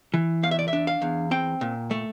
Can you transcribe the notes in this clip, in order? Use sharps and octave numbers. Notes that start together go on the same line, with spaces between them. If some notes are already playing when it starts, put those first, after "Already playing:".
E3
E2 F5
E5
D5
E5
D4
F5
E2
C4 G5
A#2
A3